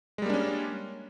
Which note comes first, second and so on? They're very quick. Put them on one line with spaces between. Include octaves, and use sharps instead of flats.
G#3 G3 A#3 D4 C#4